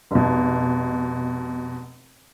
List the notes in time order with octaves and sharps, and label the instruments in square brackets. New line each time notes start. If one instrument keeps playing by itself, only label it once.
[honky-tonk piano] F1 B2